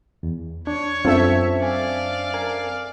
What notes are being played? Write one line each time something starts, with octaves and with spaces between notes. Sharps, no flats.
E2
D4 C#5
F#2 C4 D4 F4 A4 E5
D5 F5 G#5
A#4 G#5